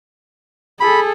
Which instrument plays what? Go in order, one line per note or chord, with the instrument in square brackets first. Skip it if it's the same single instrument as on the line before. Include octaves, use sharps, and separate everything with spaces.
[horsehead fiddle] G#4 A4 [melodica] B5